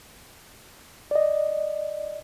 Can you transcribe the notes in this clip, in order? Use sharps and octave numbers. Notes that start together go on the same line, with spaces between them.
D5 D#5